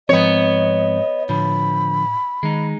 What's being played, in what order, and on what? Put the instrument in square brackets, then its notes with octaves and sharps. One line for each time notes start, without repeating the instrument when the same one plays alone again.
[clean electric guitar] F2 G#2 [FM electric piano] F3 C4 [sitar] B3 C#5 [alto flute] D#5
[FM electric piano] A2 [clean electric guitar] D3 F3 [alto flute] B5
[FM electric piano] D#3 [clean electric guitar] G#3 D#4